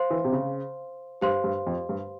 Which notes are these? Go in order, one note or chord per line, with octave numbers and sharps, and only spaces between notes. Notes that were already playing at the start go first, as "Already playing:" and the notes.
Already playing: C5 F5 C6
E3
C3
C#3
G2 G4 C5 F5 C6
G2
F2
G2